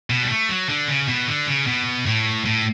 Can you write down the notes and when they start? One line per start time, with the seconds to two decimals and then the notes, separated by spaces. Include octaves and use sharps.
0.10 B2
0.23 G3
0.30 A3
0.49 F#3
0.69 D3
0.88 C#3
1.08 B2
1.27 D3
1.47 C#3
1.67 B2
2.06 A2
2.45 A2